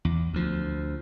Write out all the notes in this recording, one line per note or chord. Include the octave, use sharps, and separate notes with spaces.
E2
D2 F3